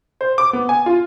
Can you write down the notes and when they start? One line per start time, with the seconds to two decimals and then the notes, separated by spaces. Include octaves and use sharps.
0.21 C5
0.38 D6
0.53 B3
0.69 G#5
0.86 F4